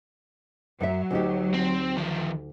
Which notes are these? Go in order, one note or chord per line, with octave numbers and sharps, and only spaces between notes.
F#2 F#3 E5
D2 D#4 G4
C4
D#3 F3